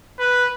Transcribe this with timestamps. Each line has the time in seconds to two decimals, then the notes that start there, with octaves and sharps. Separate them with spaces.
0.19 B4